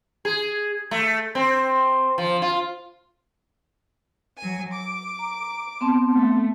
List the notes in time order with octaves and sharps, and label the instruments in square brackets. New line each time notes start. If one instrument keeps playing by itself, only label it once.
[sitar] G#4
A3
C4
F3
F4
[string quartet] F#3 G#5
D6
[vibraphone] A#5
B3 C4 A5
[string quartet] A3